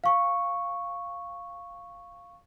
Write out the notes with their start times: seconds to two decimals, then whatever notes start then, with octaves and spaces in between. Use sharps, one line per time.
0.04 F5 C#6